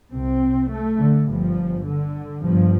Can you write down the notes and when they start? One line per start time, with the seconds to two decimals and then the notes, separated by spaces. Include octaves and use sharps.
0.11 C2 C3 C4
0.69 A3
0.99 D3
1.28 G1 G2 F3
1.85 D3
2.43 G1 G2 F3